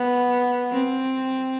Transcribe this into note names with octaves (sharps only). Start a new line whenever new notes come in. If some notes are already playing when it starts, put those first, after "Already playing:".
Already playing: B3
C4